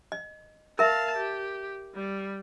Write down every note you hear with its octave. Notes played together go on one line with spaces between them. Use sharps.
D#5
A#4 E5 F5 A5
G4
G3